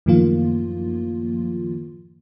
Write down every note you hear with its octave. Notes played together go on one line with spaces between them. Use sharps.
F#2 A2 D#3 F3 A#3 F4